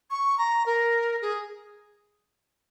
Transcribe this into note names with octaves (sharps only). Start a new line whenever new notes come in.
C#6
A#5
A#4
G#4